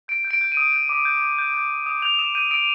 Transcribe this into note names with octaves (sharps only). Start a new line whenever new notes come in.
G6 D7
G6
D7
G6
D#7
D#6
G6
D6
G6
G6
G6
G6
D#6
D#6
G6 F7
D#6 E7
G6 D#7
D#6 D7